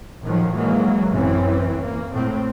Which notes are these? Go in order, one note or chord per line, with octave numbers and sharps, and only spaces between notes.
A2 D#3 F3 F#3
E3 F#3 G#3 A#3
A1 F#2 E3 C4 C#4
A#3
A2 C4